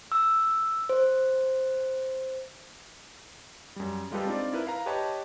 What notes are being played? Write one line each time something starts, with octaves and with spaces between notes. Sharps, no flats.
E6
C5
F#2 G3
G3 G#3 F4 G4 A4 B4
C4 D4 D#4 F4 D5
E4 A#4 B4
B4 F5 A#5
G4 B4 C#5 D#5 A5